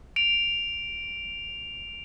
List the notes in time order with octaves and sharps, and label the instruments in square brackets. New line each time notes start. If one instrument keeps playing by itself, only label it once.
[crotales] D7 F7